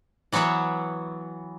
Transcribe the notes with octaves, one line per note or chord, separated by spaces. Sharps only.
E3 F#3 B3 C#5 E5